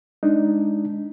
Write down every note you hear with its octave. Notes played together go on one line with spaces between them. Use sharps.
G#3 D4 D#4